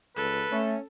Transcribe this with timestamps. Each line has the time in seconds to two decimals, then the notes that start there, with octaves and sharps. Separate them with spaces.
0.16 C#2 A4 B4
0.52 A3 C#4